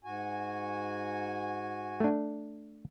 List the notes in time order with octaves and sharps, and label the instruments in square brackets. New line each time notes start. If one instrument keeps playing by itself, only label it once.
[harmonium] G#2 F#4 G#5
[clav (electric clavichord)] A3 D4